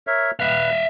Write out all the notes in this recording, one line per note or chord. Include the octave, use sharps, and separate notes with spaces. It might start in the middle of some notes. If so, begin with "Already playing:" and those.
A#4 C#5 E5
B4 E5 F5